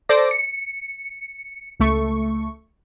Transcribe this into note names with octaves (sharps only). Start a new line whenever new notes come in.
A4 C5 D5 D6 A#6
C#7
C#2 A3 C#6